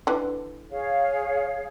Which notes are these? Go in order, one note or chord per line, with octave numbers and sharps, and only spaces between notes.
D3 E3
G#4 C#5 F5